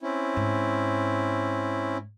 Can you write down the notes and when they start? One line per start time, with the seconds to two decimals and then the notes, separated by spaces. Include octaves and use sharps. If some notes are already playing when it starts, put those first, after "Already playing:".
0.02 C4 C#4 E4
0.36 G#2